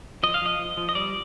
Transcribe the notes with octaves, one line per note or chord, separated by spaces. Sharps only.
F3 D#5
F5
F3 D#5
F3
F3
D#5
G3 D5